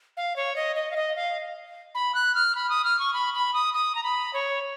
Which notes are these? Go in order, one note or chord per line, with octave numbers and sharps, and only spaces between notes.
F5
C#5
D#5
D#5
F5
D#5
F5
B5
F#6
F6
B5
D#6
F6
C#6
B5
B5
D#6
D#6
A#5
B5
C#5